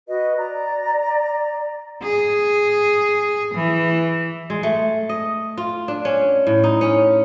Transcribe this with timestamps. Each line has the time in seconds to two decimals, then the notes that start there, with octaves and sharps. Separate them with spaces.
0.08 F#4 B4 D#5
0.39 D5 A#5
2.02 G#4
3.54 E3
4.50 G#3
4.63 A3
5.09 D#5
5.58 F4
5.88 D4
6.05 C#4
6.47 A2
6.64 D#4
6.81 C#4